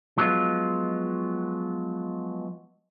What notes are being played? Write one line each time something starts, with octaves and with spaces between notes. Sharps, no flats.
F3 F#3 G#3 B3 F4